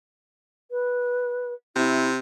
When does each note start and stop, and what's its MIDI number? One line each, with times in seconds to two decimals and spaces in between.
0.71 1.53 71
1.76 2.18 48
1.76 2.09 64